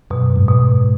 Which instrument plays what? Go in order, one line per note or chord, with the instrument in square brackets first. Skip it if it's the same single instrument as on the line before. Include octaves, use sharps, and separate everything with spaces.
[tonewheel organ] F#2 [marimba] B2
[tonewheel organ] G#2
[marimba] B2
[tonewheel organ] G#2